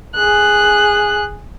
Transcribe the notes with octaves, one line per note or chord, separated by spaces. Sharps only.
G#4 F#6